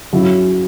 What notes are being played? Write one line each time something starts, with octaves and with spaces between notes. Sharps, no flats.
F#2 C#3 F#3 C#4 E4